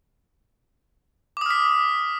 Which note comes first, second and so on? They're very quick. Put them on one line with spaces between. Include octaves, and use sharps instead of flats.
D6 D#6 F6 B6